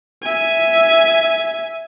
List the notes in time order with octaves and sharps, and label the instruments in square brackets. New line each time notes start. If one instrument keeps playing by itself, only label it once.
[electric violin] E5 G#5